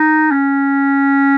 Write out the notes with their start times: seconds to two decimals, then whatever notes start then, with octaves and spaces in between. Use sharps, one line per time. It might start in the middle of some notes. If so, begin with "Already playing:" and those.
Already playing: D#4
0.31 C#4